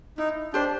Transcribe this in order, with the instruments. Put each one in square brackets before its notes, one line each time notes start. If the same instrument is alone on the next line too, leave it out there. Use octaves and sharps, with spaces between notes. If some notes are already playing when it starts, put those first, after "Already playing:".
[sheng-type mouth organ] D#4 [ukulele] E4
[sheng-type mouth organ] D4 [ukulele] G4 C5